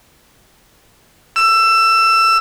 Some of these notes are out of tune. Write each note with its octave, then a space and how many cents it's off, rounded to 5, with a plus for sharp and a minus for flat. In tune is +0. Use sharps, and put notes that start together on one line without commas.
E6 +20